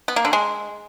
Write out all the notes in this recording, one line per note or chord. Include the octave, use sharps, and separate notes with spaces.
B3
A#3
D3
G#3